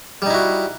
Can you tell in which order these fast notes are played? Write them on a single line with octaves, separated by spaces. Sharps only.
G3 D#4 E4 F#4